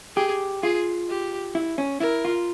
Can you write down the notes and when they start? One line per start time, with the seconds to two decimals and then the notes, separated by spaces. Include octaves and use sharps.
0.16 G4 G#4
0.63 F4 G#4
1.09 G4
1.55 E4
1.78 C#4
2.00 E4 A#4
2.25 F4